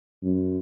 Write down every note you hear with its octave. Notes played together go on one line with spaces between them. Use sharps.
F#2